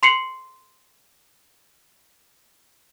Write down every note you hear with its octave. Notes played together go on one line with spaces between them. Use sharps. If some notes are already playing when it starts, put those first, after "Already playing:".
C6 C7 C#7 F#7